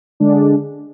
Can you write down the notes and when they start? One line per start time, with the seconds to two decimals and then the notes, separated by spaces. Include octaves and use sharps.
0.20 D3 G#3 D4